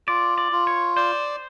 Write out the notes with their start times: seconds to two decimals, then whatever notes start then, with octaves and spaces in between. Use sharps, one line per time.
0.08 F4 D5
0.38 D5
0.52 F4
0.67 C#5
0.97 C5 D5